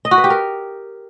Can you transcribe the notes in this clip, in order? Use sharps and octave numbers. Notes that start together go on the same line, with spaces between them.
D#5
F#4
B4
G4
A#4